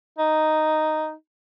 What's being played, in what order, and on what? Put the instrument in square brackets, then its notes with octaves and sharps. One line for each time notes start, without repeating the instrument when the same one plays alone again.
[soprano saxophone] D#4